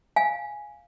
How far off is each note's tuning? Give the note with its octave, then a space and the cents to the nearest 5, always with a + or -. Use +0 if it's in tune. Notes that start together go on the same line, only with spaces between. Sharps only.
F5 +0 G#5 +0